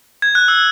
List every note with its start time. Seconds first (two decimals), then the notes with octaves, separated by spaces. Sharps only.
0.22 G#6
0.35 F#6
0.48 E6